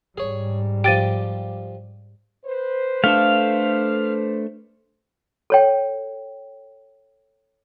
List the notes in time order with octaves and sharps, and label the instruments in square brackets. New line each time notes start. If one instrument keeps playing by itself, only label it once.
[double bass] G#2 G3 [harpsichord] G#4 C#5
[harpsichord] F3 G4 [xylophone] G5 A6 D#7
[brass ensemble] B4 C5
[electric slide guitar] A3 D4 A4 [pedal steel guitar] F5
[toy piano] A4 C#5 G5